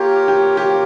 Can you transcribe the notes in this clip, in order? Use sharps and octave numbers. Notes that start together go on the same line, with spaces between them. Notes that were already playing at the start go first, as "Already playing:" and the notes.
Already playing: A#3 F4 G4 A#4 C#5
G4
G4